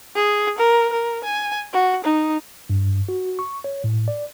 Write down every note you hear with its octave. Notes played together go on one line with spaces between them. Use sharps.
G#4
A#4
A#4
G#5
F#4
D#4
G2
F#4
C#6
C#5
A2
D5